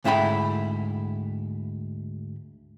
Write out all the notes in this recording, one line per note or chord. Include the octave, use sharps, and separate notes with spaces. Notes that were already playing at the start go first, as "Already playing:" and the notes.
D2 G#2 E4 F#5 G5 B5